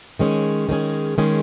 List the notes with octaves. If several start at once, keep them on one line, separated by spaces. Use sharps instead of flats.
D#3 G#3 C#4 G#4
D#3 G#3 C#4 G#4
D#3 G#3 C#4 G#4